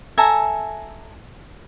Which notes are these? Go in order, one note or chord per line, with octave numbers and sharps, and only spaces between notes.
A4 E5 G#5 A#5